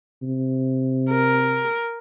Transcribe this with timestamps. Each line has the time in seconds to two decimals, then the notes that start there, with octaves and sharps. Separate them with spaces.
0.22 C3
1.10 A#4